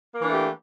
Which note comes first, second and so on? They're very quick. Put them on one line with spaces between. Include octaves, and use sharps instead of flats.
A#3 E3 D4 A3 G4